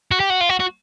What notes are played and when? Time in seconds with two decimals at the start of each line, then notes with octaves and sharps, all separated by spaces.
0.11 F#4
0.20 G4
0.30 F#4
0.41 F4
0.50 F#4
0.60 F#4